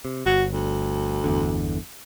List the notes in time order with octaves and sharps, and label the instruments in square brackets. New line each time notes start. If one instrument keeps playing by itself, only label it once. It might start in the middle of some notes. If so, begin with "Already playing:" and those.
[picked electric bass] C3
[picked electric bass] G1 [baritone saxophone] F#4
[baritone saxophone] D2
[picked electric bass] G1 E2 D3